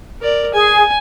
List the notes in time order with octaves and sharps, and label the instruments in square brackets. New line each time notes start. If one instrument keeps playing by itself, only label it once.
[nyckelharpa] A#4 D5
[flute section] G#4 [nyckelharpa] G#5